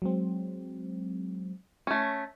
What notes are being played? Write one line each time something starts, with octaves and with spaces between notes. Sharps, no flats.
F#3 G#3 C4
A3 C#4